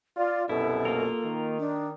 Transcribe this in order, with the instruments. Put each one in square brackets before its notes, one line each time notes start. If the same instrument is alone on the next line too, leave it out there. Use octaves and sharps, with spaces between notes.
[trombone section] F4 [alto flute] D5
[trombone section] C2 F#2 B2 [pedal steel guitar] E4 [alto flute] A4
[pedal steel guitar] A#3 F4 A#4
[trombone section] D#3
[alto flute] D4